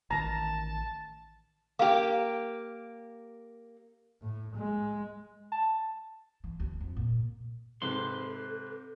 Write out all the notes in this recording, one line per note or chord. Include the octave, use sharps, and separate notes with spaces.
A1 D#3 A5 A#5
A#3 G4 F5 A#5 D6
A2
G#3
A5
E3
D2
F2
A#2
G#2 C3 A4 B4 C5 C6